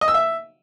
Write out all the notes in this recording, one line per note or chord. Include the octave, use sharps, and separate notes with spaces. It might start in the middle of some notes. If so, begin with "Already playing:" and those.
D#5
E6
E5